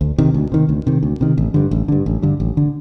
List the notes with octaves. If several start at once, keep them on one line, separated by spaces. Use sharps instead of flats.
D2
C3 D#3
D2
C3 D#3
D2
C3 D#3
D2
C3 D#3
A1
G2 D3
A1
G2 D3
A1
G2 D3
A1
D3